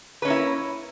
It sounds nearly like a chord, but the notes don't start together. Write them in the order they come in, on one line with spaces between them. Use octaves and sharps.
B4 C#4 A#3 E4